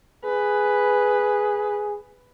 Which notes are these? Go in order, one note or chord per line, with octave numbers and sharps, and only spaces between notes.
G#4 B4